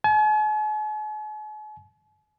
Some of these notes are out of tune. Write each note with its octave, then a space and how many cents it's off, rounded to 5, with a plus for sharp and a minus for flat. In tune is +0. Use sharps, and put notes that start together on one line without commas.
G#5 +45